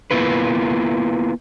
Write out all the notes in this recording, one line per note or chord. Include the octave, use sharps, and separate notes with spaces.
A#3 B3 E4 F4 B4